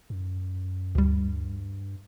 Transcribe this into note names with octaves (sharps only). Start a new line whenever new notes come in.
F#2
D2 G2 G3